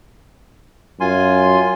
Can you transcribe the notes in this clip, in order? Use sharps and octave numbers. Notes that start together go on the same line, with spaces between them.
F#2 F4 G#5 C6